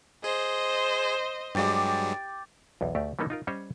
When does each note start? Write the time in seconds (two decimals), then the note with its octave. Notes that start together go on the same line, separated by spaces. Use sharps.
0.24 G#4 C5 D#5
1.55 G2 F#3 G#3 G4 D5 D6
2.81 B1 E2
2.95 D2 A3 G4
3.19 E3 G3 A#3 C#4 D#4 A4
3.30 D#4 F4 A#4
3.47 G3 C#4 C5 C#5 D#5